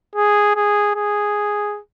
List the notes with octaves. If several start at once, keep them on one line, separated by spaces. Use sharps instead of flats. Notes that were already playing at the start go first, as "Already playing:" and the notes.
G#4
G#4
G#4